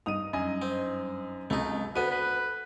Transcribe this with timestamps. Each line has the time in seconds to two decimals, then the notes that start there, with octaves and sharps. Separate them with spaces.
0.06 G2 D#4 D#6 D#7 F7
0.33 F#2 D#5 G#5
0.62 C4
1.50 C#2 C3 A3 D#4
1.96 D2 B3 A4 B4 D#7
2.11 B4